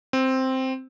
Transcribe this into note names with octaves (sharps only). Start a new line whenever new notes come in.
C4